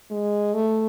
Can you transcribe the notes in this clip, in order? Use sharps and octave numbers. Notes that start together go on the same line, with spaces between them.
G#3
A3